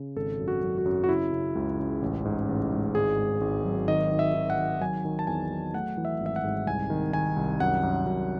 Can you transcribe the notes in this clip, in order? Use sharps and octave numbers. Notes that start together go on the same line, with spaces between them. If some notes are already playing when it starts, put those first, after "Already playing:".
Already playing: C#3
G#1 A4
F#2
F#4
F#2
F#4
F#2
F#4
C#3 E4
C#3
C#2
C#3
A1
G#2
A1
G#2
G#1 G#4
G#2
G#1
F#3
D#3 D#5
D#3
E5
D#3
F#5
D#3
F#3 G#5
D#3
A5
E2 G#5
F#3
A3 F#5
E3
E5
G#1
E5
F#5
G#2
C2 G#5
D#3
D#3 G#5
C2
F#2 F#5
F#2
F#2